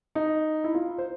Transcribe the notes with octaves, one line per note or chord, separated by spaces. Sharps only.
D#4
E4
F4
C5